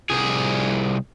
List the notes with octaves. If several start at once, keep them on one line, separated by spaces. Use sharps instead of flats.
C2 G#4